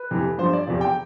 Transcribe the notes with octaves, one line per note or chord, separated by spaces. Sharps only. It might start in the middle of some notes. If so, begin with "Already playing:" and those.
Already playing: B4
F2 C3 E3
G2 F3 C5
D5
E2 C3 F3
G5